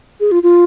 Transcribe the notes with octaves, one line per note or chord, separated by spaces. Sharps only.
G#4
F4
F4